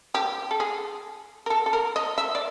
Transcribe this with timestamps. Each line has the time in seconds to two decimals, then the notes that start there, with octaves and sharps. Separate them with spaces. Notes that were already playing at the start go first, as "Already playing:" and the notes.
0.14 G4
0.51 A4
0.60 G#4
1.46 A#4
1.50 A4
1.66 A4
1.73 A#4
1.96 D#5
2.18 E5
2.35 D5